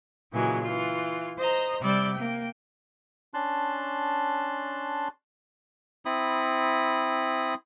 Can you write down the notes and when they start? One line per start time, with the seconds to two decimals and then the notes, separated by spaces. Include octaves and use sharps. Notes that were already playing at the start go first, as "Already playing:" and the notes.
0.32 A#2 C#3 E3 F#3 G#3
0.63 E3 F4
1.38 C5 D#5 A#5
1.81 C3 G3 D5 D6 E6 G6
2.13 A#3 G5
3.34 C#4 D4 A5 C6 F#6
6.05 C4 E4 B5 D#6